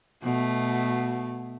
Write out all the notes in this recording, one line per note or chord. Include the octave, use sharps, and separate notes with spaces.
B2 A3